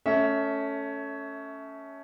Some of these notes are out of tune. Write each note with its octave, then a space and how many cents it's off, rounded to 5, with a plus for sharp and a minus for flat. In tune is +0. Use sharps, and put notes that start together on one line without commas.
A3 +0 C#4 +10 E5 -20